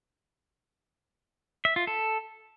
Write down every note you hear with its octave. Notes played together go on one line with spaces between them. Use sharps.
E5
F4
A4